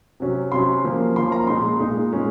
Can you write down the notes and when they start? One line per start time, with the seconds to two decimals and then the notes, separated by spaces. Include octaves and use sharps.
0.20 C3 F#3 C#4
0.52 C3 F#3 C#4 C6
0.84 F3 A#3 C#4
1.16 F3 A#3 C#4 C6
1.32 A#5
1.47 A#2 G#3 D#4 C6
1.80 A#2 G#3 D#4
2.12 A#2 G#3 C#4